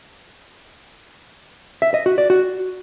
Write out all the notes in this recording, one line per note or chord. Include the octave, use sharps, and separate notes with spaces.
E5
D#5
F#4
D5
F#4